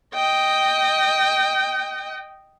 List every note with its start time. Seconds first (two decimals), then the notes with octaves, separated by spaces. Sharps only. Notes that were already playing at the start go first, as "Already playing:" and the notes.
0.14 D#5 G5